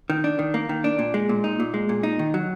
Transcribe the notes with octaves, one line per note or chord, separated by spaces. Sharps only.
D#3
D4
D#3
A#3
D#3
D4
A#2
G#3
A#2
D#4
A#2
G#3
A#2
D#4
D#3
F#3